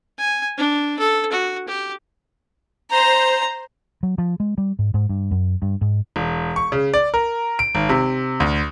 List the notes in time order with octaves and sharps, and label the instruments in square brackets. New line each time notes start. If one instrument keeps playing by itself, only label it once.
[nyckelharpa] G#5
D4
A4
F#4
G4
[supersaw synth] C5 [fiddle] A#5
[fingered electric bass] F#3
F3
G#3
G3
G#2
G#2
G2
F#2
G2
G#2
[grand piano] E1
C#6
C#3
D5
A#4
D7
G#1
C3
D2